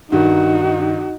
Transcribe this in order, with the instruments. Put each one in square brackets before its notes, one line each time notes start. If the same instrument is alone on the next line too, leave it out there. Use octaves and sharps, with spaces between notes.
[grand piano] G2 D#3 [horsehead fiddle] D#4 F#4